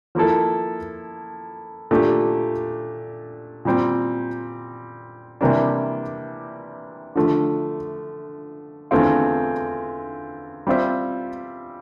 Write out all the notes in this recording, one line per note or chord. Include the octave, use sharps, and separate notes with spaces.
F3 A#3 E4 A4
A#2 A3 D4 G4
A#2 G3 C4
C3 E3 G3 A#3 D4
D3 F3 A3
E2 D3 A3 C4 F4
G3 C4 F4 C5 E5